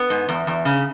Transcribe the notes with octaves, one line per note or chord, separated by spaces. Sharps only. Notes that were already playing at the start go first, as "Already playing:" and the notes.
Already playing: B3
G#2
E2
E2
C#3